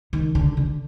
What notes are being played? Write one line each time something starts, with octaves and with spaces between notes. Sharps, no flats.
D#3
D3
D3